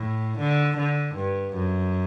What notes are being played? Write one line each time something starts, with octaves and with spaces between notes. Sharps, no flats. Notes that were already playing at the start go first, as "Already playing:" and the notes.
Already playing: A2
D3
D3
G2
F#2